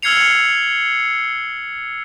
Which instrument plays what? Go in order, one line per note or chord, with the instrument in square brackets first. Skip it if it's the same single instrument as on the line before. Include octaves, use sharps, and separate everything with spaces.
[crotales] E6 F6 G#6 C7 C#7 F7